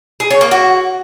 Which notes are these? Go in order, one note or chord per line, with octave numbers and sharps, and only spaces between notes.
G#4
C#5
A#3
F#4